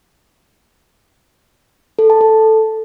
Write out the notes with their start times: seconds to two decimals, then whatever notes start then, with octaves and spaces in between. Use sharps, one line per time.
1.99 A4
2.10 A5
2.21 A4